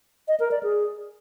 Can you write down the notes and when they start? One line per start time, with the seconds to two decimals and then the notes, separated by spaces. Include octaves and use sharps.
0.28 D#5
0.40 A#4
0.51 D5
0.63 G#4